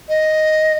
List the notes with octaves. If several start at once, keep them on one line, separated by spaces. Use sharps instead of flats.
D#5